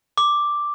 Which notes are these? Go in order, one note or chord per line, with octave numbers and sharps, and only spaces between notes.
D6